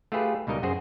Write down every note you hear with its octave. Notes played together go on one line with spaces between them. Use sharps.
A3 F4 G4 G#4 B4
C#2 B2 G3 D#4 A#4 D#5
F#2 F#4 G#4 C5